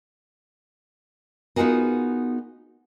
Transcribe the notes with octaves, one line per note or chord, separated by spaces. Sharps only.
B3 D#4 F4 F#4 G#4 A#4